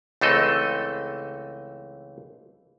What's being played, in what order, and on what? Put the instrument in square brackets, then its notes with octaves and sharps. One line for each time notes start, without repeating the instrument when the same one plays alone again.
[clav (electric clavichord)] C#2 E3 A3 C4 A4 D#5